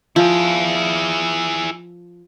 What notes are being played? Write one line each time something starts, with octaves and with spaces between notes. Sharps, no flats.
F3 E4 G#4